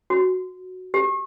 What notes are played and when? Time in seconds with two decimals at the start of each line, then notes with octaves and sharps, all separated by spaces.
0.10 F#4
0.94 G4